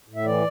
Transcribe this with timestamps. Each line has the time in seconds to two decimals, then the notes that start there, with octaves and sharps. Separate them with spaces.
0.08 A2
0.16 E5
0.25 E3 D5